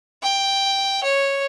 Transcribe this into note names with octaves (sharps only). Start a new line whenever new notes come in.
G5
C#5